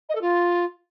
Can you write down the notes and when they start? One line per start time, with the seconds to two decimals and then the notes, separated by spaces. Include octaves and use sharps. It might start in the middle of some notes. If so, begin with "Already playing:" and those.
0.09 D#5
0.15 A4
0.21 F4